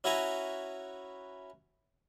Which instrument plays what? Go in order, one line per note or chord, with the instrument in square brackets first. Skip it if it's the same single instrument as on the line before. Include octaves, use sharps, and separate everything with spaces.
[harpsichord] C#4 E4 F#4 B4 G#5 A#5